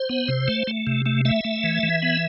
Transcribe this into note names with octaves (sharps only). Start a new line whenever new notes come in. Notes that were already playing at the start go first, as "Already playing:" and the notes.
Already playing: C5
B3
C3
A3
A3
C3
A3
A3 E5
A3
E3
E3
B3